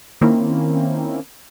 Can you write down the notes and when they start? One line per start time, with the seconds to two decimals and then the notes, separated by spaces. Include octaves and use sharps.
0.21 D#3 A#3 C4 C#4 E4